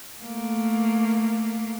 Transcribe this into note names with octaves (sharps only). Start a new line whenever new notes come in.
A3 A#3